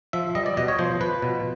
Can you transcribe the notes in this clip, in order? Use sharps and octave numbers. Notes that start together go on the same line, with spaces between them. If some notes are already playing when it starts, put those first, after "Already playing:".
F3 E5
G3 D#5
D5
B2 D#5
C#5
F3 C5
F3 B4
B2